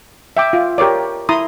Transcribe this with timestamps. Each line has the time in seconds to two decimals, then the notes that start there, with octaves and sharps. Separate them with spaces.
0.37 E5 G5 D6
0.53 F4
0.78 G4 A#4 C#5 D5
1.29 E4 A#5 C6 D#6